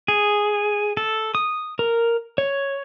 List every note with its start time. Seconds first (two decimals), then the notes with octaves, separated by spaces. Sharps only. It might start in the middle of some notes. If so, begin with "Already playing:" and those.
0.08 G#4
0.97 A4
1.35 D#6
1.79 A#4
2.38 C#5